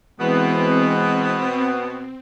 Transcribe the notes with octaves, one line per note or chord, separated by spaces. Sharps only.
B2 E3 G#3 B3 C4